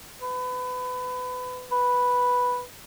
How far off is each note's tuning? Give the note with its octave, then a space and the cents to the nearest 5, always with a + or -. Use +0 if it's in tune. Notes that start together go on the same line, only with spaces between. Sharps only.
B4 +25
B4 -5